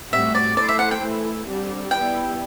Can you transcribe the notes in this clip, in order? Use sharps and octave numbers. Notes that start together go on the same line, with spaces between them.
A2 G3 C4 F#4 E5
D5
A3 E4 A4 C5 D5
E5
F#5
G5
E3 A3 E4
D3 G3 C4
G3 B3 E4 G4 G5